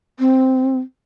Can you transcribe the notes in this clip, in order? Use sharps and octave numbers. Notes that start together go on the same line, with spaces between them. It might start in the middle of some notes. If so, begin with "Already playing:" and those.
C4